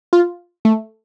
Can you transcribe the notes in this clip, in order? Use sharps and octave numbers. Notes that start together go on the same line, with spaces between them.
F4
A3